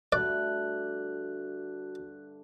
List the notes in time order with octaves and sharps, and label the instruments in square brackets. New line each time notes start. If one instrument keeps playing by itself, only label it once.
[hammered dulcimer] G2 D3 A3 [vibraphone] F#4 [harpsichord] D5 [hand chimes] F#6